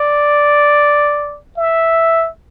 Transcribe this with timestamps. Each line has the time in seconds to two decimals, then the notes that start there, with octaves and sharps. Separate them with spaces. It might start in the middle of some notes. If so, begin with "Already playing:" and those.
Already playing: D5
1.57 E5